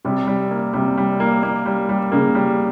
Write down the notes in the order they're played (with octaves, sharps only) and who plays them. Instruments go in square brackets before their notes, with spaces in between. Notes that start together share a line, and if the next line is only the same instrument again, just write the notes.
[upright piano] C3 [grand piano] G3
[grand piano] G3
A#3
[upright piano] C3 [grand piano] G3
[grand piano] G3
A#3
A#3
G3
G3
[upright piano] C#3 [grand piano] A#3
[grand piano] G3